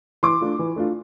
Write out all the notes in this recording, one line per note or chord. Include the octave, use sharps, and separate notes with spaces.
E3 C6 D6
A3 D4 F4
E3
A3 D4 F4